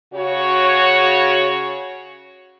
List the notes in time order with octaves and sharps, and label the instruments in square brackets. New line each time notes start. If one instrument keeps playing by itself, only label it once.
[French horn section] C#3 F#4 C#5